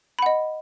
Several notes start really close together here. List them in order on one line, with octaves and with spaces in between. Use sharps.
B5 F#5 D#5